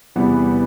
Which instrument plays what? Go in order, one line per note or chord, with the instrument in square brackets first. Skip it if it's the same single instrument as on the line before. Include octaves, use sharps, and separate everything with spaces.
[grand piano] E2 C3 E3 G3 B3